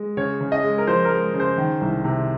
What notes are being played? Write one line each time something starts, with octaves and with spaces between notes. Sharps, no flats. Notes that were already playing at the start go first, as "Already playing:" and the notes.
Already playing: G#3
C#3 C#5
C#3
D#5
G#3
A#4
F3 C5
A#4
G#3
C#3
C5
D#3
C2
C3